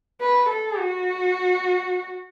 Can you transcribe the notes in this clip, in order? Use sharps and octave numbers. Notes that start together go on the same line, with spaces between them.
B4
A4
F#4